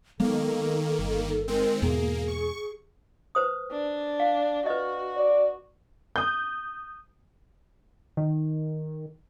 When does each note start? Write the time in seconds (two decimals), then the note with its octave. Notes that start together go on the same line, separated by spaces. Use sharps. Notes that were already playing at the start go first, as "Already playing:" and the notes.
0.20 D#3 F#3 G#3 A#3 B3 A4
0.99 G1
1.48 D#3 G#3 C4 A#4
1.82 E2 G#2 B2 A#3 G#4
2.28 C#6
3.35 B4 C5 D#6
3.72 D4
4.20 F5
4.66 F#4 B4 D#5
5.17 D5
6.16 D#6 G6
8.17 D#3